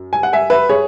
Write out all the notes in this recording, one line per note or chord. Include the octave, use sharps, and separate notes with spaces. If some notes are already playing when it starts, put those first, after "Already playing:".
Already playing: F#2
G#5
F#5
E5 G#5
B4 E5
G#4 C#5